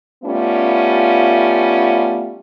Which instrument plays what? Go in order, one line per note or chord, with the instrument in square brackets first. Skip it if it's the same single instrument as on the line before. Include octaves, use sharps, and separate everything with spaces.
[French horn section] G3 A3 B3 C#4 F4